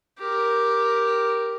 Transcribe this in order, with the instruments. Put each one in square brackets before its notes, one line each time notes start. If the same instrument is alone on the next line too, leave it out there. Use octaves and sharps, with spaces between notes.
[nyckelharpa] G4 A#4